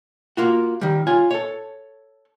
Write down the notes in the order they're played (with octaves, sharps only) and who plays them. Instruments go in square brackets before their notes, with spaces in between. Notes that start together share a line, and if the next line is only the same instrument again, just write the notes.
[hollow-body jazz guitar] A#3 F4 F#4
D#3 G3
F4 C#5 G#5
A4 C#5